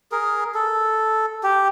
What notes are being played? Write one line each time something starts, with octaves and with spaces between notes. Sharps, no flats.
G#4 A#4
A4
G4